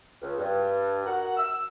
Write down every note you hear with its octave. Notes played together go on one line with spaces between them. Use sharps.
C#2
G2
F#4 A#4 F#5
E6